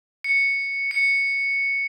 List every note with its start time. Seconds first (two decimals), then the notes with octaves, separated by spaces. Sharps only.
0.24 C#7
0.91 C#7